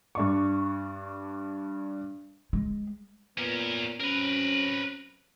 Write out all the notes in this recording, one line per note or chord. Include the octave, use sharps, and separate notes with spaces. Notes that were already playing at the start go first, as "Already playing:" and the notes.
G2 D4 C#6
G#3
A#2 B3 C#4 A#4
F#3 C4 C#4 A#4 B4